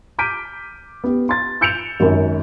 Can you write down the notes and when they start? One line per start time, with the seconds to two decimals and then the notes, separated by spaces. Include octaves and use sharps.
0.19 D6 F6 G6 B6 D7 D#7
1.04 B3 G4
1.29 C6 A6
1.61 E6 G6 C#7 D7 E7 F7
2.00 G#1 F#2